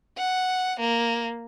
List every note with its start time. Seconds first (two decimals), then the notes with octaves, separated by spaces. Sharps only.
0.18 F#5
0.80 A#3